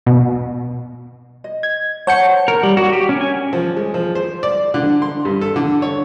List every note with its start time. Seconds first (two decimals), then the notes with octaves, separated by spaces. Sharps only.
0.06 B2
1.44 D#5
1.63 G#6
2.07 C5 C#5 F#5 A5 G6 C#7
2.48 A#4
2.63 G3
2.77 F#4
2.92 G4
3.09 C#4
3.21 G#5
3.53 F3
3.77 G#3
3.94 F3
4.15 C5
4.43 D5
4.74 D3
5.02 C6
5.25 G2
5.41 A4
5.56 D3
5.82 C#5